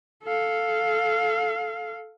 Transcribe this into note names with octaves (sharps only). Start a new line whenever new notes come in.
A4 F5